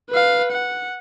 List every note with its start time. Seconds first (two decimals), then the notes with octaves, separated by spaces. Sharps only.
0.10 B4 F5
0.52 F#5